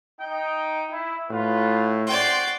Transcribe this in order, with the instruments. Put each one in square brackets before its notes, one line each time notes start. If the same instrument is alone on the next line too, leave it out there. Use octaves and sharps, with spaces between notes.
[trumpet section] D#4 G5
E4
[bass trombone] A2 [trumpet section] F4 B4
[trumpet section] F#4 C5 C6 [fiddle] D5 G5